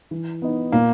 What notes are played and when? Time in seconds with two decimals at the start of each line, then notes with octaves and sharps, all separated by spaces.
0.11 E3
0.42 B3 D#4
0.72 A#2 A#3